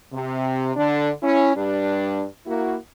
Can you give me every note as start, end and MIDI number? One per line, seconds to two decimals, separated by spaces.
0.13 0.71 48
0.76 1.09 50
0.76 1.09 62
1.23 1.54 61
1.23 1.54 64
1.56 2.26 43
1.56 2.26 55
1.56 2.26 62
2.46 2.75 58
2.46 2.75 64
2.46 2.75 66